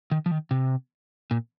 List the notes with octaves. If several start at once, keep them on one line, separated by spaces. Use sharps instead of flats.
D#3
F3
D#3
C3
A#2